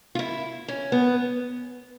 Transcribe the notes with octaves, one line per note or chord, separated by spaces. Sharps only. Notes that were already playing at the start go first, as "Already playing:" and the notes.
F4
E4
C#4
B3